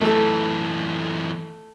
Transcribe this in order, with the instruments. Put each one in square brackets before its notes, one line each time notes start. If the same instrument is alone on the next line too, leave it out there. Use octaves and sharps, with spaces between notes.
[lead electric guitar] F#2 E3 [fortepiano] A3 A4